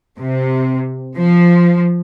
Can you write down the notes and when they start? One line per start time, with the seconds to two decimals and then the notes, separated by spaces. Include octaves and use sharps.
0.18 C3
1.17 F3